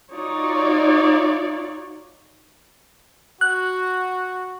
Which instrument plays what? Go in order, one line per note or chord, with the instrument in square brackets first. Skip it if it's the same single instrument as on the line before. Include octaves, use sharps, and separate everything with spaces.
[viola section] D#4 F4 F#4 C#5 D5
[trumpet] F#4 [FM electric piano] F#6